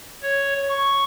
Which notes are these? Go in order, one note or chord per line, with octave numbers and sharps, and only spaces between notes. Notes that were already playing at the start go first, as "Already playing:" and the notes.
C#5
C#6